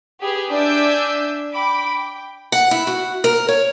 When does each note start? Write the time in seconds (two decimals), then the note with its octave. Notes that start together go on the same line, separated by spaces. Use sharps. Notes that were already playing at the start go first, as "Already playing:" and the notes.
0.21 G4 G#4 B4
0.51 D4 E5 G#5 D6 E6 G6
1.53 G5 B5 D6
1.89 G5
2.52 F#5
2.71 E4
2.87 F#4
3.24 A#4
3.48 C#5